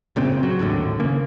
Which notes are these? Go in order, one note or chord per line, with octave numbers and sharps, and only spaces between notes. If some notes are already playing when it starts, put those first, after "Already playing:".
F#1 A#2 C#3 C4
F#3
G#1 D#2 A2 D3
C#3 A#3